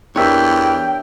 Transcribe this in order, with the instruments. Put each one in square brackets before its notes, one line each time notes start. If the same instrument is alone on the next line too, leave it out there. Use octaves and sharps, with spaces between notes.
[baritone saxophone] E2 [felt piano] D4 G4 A#4 [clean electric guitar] C#5 E5 [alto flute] G5